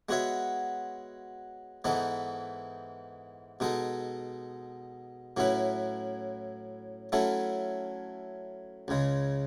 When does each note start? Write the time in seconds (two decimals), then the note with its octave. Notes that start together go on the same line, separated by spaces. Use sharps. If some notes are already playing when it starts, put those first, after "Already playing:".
0.09 G#3 B3 F#4 C#5 E5
1.84 G#2 E3 B3 D#4 A4
3.60 B2 G#3 D#4 A4
5.37 A2 F#3 C#4 E4 B4
7.12 F#3 A3 C#4 E4 A4
8.88 C#2 C#3 G#3